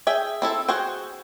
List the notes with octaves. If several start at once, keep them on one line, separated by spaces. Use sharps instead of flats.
G#4 E5 G5
C4 E4 A4
F#4 G#4 C5 G5